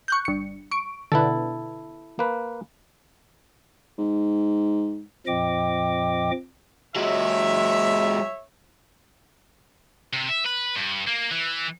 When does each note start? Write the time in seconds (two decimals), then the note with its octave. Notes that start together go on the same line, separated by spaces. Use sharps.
0.08 C#6 F#6 G6
0.25 G1 C#7
0.71 C#6 D7
1.12 B2 D3 E4 A4
2.19 A#3 B4
3.99 G#2
5.27 F2 A#2 F3 D#5 G5 D6
6.96 F#3 G#3 C#5 E5
10.13 C3
10.29 E5
10.46 B4
10.76 G2
11.08 A#3
11.31 E3